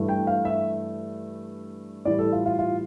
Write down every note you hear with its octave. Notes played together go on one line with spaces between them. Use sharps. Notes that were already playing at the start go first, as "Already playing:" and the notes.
Already playing: G2 E3 A3
G5
F5
E5
A2 E3 G3 D5
A4
F4
F4
F4